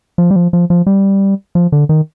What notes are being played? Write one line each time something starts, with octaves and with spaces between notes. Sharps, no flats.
F3
G3
F3
F3
F3
G3
F3
D3
D#3